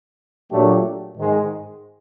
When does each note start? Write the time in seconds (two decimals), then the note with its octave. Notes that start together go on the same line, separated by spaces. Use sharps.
0.50 A#2 F#3 A3 D4 G4
1.16 G#2 D#3 G#3